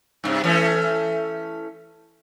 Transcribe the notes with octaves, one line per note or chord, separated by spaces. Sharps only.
G2 C3
E3 A3 C#4